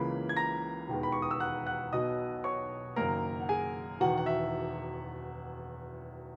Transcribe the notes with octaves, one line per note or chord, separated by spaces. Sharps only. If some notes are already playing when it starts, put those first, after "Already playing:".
Already playing: C#2 C#3 E3 A#3 B5
G#6
A#5 A#6
E1 D#2 D#3 G#3 B3
B5
C#6
D#6
E6
F#5 F#6
F#5 F#6
B1 B2 F#3 B3 D#5 D#6
C#5 C#6
F#1 F#2 D#3 A#3 A#4 A#5
F#5
G#4 G#5
E1 E2 D#3 F#4 F#5
F#5
E5